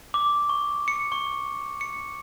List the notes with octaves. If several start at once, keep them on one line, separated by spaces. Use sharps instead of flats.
D6
C#6
C#7
C#6
C#7